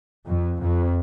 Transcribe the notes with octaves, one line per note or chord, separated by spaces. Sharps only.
F2
F2